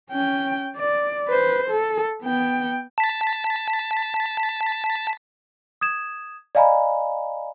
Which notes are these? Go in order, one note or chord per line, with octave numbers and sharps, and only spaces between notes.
C#4 G5
D5
B4 C5
A4
B3 G5
A5 B6
D#6 G#6 E7
D5 D#5 F5 G#5 A#5 B5